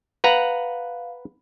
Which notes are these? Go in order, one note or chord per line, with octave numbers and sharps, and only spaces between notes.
B4 F5 F#5 A#5